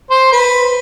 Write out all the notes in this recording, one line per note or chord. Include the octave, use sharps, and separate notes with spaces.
C5
B4